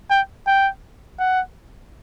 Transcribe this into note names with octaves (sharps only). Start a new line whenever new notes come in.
G5
G5
F#5